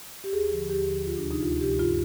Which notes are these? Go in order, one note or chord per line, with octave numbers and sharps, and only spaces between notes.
G4
D#2 G#4
D3 F3
D#2 G4
D3 F3
D2 F4
D4
C3 F3
D#4
D2 F4
C3 F3 G4
G2 F4